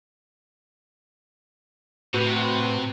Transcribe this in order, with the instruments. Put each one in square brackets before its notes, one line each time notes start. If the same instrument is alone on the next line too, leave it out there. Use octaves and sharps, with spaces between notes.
[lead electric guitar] A2 [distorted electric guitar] C3 [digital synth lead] F#4 [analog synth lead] B4